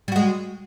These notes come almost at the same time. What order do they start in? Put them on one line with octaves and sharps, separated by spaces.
G3 F#4 G#3